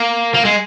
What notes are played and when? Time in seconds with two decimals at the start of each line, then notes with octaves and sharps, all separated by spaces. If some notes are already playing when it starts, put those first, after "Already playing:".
Already playing: A#3
0.34 A#3
0.45 G#3